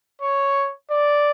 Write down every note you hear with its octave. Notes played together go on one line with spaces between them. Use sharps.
C#5
D5